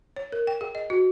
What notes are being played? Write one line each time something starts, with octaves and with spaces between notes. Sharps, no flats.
C#5
A#4
G5
G#4
D#5
F#4